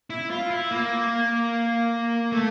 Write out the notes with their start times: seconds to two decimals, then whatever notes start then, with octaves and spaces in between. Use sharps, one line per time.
0.10 E4
0.30 F4
0.50 E4
0.71 A#3
2.32 A3